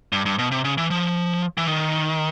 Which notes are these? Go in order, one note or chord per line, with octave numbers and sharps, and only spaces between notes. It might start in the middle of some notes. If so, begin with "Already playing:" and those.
G2
G2
B2
C3
C#3
E3
F3
E3
D#3